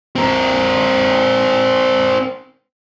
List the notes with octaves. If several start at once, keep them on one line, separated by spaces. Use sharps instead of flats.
C4 A#4